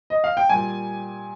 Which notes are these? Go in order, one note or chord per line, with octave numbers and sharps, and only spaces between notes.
D#5
F5
G5
A#2 G3 G#5